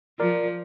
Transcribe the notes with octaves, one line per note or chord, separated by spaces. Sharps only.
F3 A#4 D5